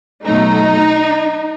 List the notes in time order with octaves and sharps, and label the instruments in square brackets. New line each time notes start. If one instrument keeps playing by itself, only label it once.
[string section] B2 F#3 A3 D#4